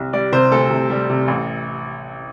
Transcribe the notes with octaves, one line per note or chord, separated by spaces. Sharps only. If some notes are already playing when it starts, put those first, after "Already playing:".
Already playing: C2
G3 D5
C3 C5
D2 A4
C3
G3
C3
A1